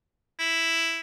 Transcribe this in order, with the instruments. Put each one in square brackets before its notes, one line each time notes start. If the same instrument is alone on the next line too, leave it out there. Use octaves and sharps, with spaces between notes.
[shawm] E4